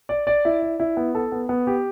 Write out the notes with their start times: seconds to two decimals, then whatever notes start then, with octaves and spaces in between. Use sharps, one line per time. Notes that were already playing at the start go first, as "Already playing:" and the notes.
0.09 D5
0.27 D5
0.45 E4
0.62 D5
0.80 E4
0.97 B3
1.15 A4
1.32 B3
1.49 B3
1.67 G4